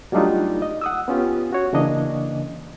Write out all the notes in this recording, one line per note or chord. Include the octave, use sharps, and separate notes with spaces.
F#3 G3 A3 D4 D#4 F4
D#5
F#5 D#6 E6
B3 C#4 F4 G4
F#4 C#5
C#3 E3 A#3 D4 D#5